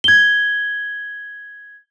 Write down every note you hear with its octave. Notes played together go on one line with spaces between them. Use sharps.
G#6 G7